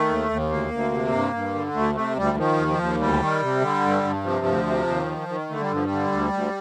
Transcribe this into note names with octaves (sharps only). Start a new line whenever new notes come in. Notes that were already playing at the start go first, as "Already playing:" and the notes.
Already playing: D#3 A3
D#2
D#2
D2 A#3
D2
C3
G2
G2
D3
D2 A3
C3 A3
D2 G3
D#3 F3
D#2
F3
D#2
D2 G3
D#3
C3
D3
G2
G2
C3 F3
D2
C3
D#2
D#3
D#3
D3 A3
G3
G2 F3
G3
D3
D2
D2